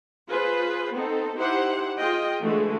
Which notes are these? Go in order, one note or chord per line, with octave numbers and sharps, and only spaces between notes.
F4 G#4 B4 C5
B3 C4 D#4 A4
D#4 E4 G4 C5 F#5
F4 G#4 D#5 G5
D3 E3 G#3 A3 F#4